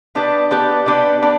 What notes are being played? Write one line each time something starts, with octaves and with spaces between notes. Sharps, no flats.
B3 D4 G4 B4 D5
B3 D4 G4 B4 D5
B3 D4 G4 B4 D5
B3 D4 D5